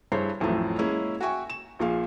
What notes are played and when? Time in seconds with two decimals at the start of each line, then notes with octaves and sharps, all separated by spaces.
0.12 G2 E4 G#4 C5 C#5 C7
0.40 A1 F2 A2 F#3 A3
0.79 G#3 A#3 C#4 E4 G#4
1.21 F#4 E5 G5 G#5 C#6
1.50 E7
1.79 A#1 A#2 G#4 F5